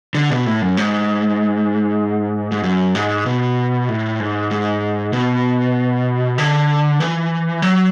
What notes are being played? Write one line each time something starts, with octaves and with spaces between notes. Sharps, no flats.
D3
B2
A2
F#2
G#2
G#2
F#2
G#2
B2
A2
G#2
G#2
B2
D3
E3
F#3